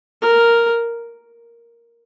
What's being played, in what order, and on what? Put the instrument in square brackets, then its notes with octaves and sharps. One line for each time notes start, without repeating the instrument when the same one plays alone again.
[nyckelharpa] A#4